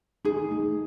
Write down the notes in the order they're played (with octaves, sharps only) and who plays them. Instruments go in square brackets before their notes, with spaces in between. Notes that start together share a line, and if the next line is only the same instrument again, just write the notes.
[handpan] D#4 [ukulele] G#4
[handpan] A3